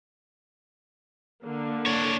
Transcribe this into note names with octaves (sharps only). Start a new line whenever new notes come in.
D3 A#3
D4 C#5